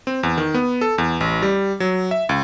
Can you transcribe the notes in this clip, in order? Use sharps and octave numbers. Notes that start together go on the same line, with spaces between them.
C4
E2
D#3
B3
A4
E2
A1
G3
F#3
E5
C#2